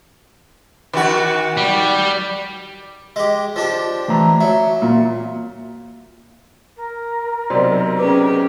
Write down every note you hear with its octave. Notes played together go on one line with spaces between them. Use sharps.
D#3 F#4
G3
G#3 G4
F3 D4 G4
E3 A3 A#5
F#3 E5
A#2
A#4
B1 C3 C5 D5 C6
C#4 G4 G#4 B4 D6